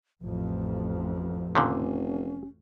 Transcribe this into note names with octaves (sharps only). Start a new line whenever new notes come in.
A1 F2 F3
F1 A#2 D3 D#3 C#4